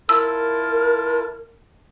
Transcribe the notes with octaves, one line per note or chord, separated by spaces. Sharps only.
E4 F4 A#4 A5 E6